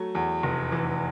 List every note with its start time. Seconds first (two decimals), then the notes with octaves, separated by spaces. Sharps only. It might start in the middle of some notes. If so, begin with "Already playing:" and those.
Already playing: F#3 A3
0.15 E2
0.43 F1
0.72 E3